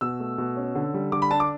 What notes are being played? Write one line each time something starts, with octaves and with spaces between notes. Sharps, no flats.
B2 E6
A3
B2
C#4
D3
G3
D3 D6
B5
D4 A5
D6